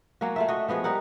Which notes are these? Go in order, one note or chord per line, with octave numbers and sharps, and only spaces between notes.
F#3 A#3 C#4 F#4
A3 F4 E5
F#4 D#5
F3 B3 F#4 G#4
G3 D#4 A#4 F#5